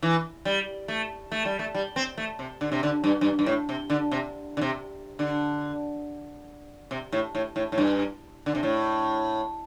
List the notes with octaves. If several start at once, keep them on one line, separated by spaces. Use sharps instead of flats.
E3
G3
A3
A3
G3
A3
G3
C4
A3
C3
D3
C3
D3
G2
G2
G2
A2
C3
D3
C3
D3
C3
D3
C3
A2
A2
A2
A2
G2
D3
C3
A2